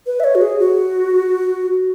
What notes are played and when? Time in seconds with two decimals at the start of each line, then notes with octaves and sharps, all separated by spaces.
0.06 B4
0.20 E5
0.24 C#5
0.35 F#4
0.41 G#4
0.59 F#4